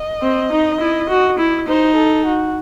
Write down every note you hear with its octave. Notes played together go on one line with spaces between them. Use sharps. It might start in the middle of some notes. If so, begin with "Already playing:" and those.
Already playing: D#5
C4
D#4
E4
F#4
E4
D#4 C5
A4
F#4